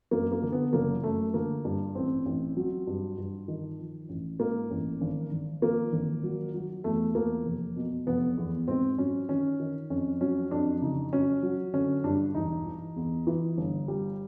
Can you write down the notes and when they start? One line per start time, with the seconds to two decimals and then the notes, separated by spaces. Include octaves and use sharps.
0.11 F#2 A#3
0.32 A#3
0.42 D3
0.52 B3
0.73 F#1 A#3
1.03 F#2 A3
1.34 D3 A#3
1.65 G2
1.95 A1 C4
2.26 A1
2.57 F#3
2.87 G2
3.18 G2
3.48 D#3
3.79 F3
4.09 A1
4.40 G#2 A#3
4.71 A1
5.01 G#1
5.31 G#1
5.62 F3 A#3
5.93 G#1
6.23 F#3
6.54 F#3
6.84 E2 A3
7.15 E2 A#3
7.46 F1
7.76 B2
8.07 F1 B3
8.37 E2
8.68 G#2 C4
8.98 F#3 C#4
9.29 D#3 C#4
9.60 D#3
9.90 F2 C#4
10.21 F#3 C#4
10.51 F2 D4
10.82 C#3 D#4
11.13 F#3 C#4
11.43 F#3
11.73 D3 C#4
12.04 G2 D4
12.35 E1 D#4
12.66 E3
12.96 E2
13.27 E3
13.57 G1
13.88 G3